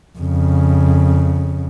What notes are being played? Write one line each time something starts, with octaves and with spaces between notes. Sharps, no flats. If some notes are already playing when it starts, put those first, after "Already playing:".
F2 C#3